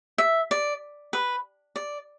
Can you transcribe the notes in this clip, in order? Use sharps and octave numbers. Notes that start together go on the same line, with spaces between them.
E5
D5
B4
D5